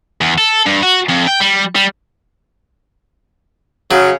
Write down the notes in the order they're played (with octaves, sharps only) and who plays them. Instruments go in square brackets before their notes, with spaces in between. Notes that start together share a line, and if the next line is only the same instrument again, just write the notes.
[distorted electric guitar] E2
A4
G2
F#4
F2
G5
G3
G3
[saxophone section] C#3 [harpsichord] F#3